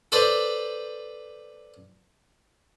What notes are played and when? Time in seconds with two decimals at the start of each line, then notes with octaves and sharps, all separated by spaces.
0.12 A4 B4 C5 D5